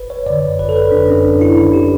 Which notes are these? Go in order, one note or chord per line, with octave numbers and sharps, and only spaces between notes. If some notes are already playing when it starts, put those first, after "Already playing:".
Already playing: G1 B4
C#5
F#2 D3 D5
G1 B4
A4
B4
F#2 D3 D4
C#4
G1 D4
E4
F#2 D3 E4
G4